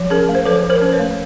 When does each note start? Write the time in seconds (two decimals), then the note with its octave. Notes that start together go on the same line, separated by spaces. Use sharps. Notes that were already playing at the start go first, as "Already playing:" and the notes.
Already playing: F3
0.10 C#4 G#4 A#4
0.29 A3
0.35 C5
0.45 F3 A4 B4
0.64 F3
0.70 A#4 C5
0.81 C#4
0.93 B4 C#5
0.99 A3